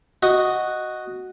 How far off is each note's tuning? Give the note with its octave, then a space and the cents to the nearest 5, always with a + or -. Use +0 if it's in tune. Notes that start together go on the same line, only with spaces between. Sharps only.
F#4 +0 D#5 +0